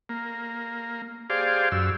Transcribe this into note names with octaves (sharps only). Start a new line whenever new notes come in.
A#3
G4 G#4 C5 D5 F5
F#2 E6